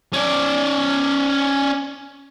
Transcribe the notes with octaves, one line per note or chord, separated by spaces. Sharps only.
C#4 D5